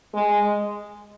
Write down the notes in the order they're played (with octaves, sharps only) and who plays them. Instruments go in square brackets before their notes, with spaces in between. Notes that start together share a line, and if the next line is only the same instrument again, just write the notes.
[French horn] G#3